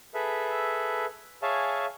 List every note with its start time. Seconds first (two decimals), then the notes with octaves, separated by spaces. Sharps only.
0.14 G#4 A4 B4 E5
1.42 G#4 C#5 E5 F5 G#5 A5